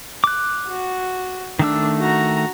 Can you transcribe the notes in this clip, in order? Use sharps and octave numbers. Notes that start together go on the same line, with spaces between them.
D6 F#6
F#4
D#3 A3 D4 E6
F#4 A#5